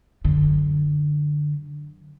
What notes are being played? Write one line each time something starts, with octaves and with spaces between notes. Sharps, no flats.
F#2 D3